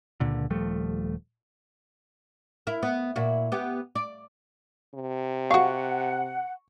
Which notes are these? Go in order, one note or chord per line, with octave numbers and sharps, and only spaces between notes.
C#2 A#2 D3
D#1 F3 G3 A3
E4 A#4
B3
A#2 E4 F#4
B3 G4
D5
C3
F#4 F5 F#5 C#6